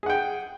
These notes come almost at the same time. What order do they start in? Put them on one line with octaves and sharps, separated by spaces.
G#4 F#5 G5